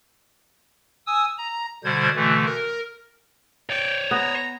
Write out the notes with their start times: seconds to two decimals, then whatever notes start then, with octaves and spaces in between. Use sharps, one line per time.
1.07 G#5 D#6 E6
1.38 A#5
1.84 B2 D3 G3 C5 G#6
2.15 B2 D3 E3 A3
2.45 A#4
3.69 C#5 D5 G5
4.11 B3 A#5